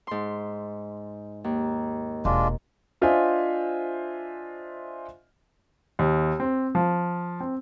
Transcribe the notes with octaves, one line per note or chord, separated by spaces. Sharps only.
G#2 C6
D#2
E1 G#3 D4 F4
D4 F4 C5 D#5 E5 G#5
D#2
C4
F3
C4